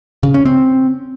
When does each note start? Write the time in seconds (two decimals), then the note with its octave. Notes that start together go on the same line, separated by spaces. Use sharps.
0.23 C#3
0.34 C#4
0.45 C4